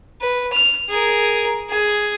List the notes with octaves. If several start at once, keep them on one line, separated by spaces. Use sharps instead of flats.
B4
F6
G#4 A#4
G#4